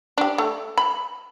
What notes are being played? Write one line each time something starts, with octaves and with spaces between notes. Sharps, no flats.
D4 G4
A3
B5